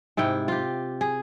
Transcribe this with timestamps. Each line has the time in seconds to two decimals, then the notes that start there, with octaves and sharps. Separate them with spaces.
0.17 G#2 C3 E4 G5
0.48 F4 G4
1.01 G#4